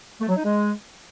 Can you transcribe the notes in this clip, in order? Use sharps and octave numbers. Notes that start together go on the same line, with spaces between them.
A3
F#3
D#4
G#3